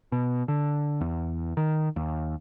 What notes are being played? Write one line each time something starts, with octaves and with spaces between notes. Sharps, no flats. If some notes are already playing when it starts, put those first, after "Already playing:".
B2
D3
E2
D#3
D#2